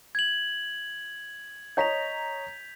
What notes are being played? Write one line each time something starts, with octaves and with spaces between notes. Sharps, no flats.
G#6 F#7
C#5 D#5 A#5 G6 B6 F7